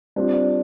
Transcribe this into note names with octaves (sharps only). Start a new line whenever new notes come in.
G3 C4 D4 F4
D4